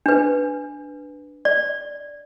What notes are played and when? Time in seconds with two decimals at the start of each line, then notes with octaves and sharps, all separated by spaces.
0.06 D4 B4
1.45 D5